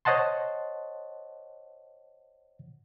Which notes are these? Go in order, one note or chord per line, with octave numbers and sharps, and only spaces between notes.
C5 C#5 D#5 F#5 A5 C6